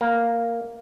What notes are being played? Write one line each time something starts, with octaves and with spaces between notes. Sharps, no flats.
A#3